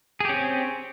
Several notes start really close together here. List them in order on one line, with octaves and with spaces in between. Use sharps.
G#4 G4 C#4 C4